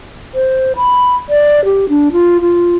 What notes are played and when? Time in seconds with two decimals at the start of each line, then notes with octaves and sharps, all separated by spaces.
0.35 C5
0.77 B5
1.29 D5
1.65 G4
1.89 D4
2.13 F4
2.41 F4